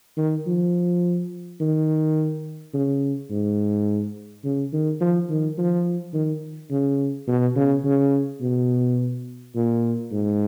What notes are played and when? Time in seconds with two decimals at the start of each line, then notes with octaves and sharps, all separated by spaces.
0.17 D#3
0.47 F3
1.60 D#3
2.74 C#3
3.30 G#2
4.44 C#3
4.73 D#3
5.01 F3
5.29 D#3
5.58 F3
6.13 D#3
6.71 C#3
7.28 B2
7.56 C#3
7.84 C#3
8.41 B2
9.55 A#2
10.12 G#2